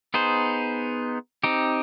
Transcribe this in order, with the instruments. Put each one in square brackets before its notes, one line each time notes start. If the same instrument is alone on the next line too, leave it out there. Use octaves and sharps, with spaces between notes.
[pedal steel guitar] B3 D#4 G#4 C5
C4 D#4 G4